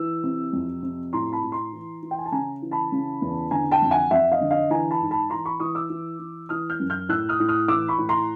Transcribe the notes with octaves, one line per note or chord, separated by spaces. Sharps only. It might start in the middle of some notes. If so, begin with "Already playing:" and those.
Already playing: E3 E6
C3
F2
C3
A2 A#5 C6
A5 B5
A2
A#5 C6
E3
E3
G5
G#5
A5
C#3 G#5 A#5
E3
A5 B5
C#3
E2
D3 G#5 A#5
G5 A5
F2
F#5 G#5
F2 E5 F#5
D#5 F5
D3
D#5 F5
E3 G#5 A#5
A5 B5
G#2
A5 B5
E3 A#5 C6
B5 C#6
E3 C#6 D#6
D6 E6
E3
E3
E3 D#6 F6
F6 G6
F#2
F6 G6
A2 E6 F#6
D#6 F6
A2
D#6 F6
E3 D6 E6
B5 C#6
A2
A#5 C6